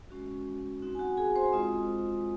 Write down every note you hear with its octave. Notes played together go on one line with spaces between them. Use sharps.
G#3 C#4 F#4
C4 D#4 F#4
G#5
F#4 F#5
G#4 G#5
C5 C6
G#3 C4 F4 D#5 D#6